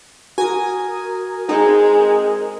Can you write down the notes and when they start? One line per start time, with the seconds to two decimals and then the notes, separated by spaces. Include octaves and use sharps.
0.38 F#4 A#4 G#5 D#6
1.49 G#3 C4 D#4